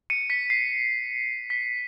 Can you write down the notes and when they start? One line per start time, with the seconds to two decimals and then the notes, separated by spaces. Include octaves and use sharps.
0.10 C#7 D#7
0.30 B6 C#7
0.50 C7
1.50 B6